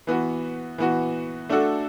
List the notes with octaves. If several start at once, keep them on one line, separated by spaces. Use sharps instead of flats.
E3 B3 F#4
E3 B3 F#4
A3 D4 F#4 A4